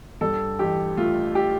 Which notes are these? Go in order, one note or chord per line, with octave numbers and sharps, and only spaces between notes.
G2 A4
A1 G4
A3 F4
G4